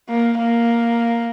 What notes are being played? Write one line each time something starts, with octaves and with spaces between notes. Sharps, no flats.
A#3
A#3